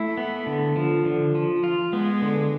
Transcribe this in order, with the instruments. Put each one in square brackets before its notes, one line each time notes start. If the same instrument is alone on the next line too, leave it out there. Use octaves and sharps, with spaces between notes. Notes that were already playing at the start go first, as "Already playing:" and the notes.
Already playing: [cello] A3 [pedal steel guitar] E4
[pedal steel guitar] B3
D3
F3
D3
F3
F4
[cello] G#3 [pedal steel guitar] B3
[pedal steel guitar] D3